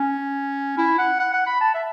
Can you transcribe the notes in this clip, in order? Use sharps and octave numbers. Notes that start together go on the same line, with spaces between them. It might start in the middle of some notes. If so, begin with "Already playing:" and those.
Already playing: C#4
E4
F#5
F#5
F#5
B5
A5
E5